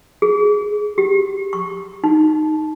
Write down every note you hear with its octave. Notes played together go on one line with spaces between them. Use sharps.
G#4
G4
C#6
D#4